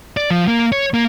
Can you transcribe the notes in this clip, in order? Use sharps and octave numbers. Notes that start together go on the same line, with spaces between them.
D5
F3
A#3
C#5
A#3